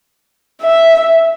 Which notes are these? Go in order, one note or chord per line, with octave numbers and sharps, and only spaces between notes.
E5